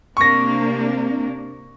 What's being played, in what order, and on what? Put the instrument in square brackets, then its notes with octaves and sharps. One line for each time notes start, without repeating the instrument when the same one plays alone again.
[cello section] C3 A#3 D4 [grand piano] C#6 A#6